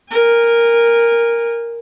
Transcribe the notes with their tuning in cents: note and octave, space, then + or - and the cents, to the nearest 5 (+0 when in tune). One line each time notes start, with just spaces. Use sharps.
A#4 +0 G#5 -30